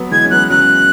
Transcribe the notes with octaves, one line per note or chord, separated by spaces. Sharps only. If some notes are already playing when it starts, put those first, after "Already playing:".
Already playing: F#3 B3
E3 G#3 G#6
C#4
F#3 B3 F#6
C#3 F#3 F#6